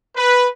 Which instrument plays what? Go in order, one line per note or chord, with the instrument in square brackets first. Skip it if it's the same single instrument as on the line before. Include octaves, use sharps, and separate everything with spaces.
[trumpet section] B4